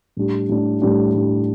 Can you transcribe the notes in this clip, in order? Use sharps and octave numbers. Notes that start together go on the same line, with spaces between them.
A2 G3 D4 G4
A2 G3 D4 G4
A2 G3 D4 G4
A2 G3 D4 G4